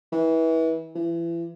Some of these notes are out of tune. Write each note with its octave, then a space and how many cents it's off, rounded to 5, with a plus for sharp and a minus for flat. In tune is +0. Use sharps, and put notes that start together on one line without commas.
E3 -25
E3 +35